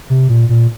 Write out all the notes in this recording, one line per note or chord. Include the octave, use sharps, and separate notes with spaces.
C3
A#2
A#2